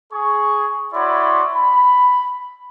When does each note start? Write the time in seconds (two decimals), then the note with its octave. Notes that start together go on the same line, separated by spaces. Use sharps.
0.11 G#4 C#6
0.94 E4 F#4 C#5 D5 B5 C6
1.53 B5